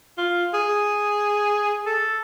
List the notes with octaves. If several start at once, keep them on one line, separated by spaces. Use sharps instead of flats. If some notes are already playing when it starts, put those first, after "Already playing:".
F4
G#4
A4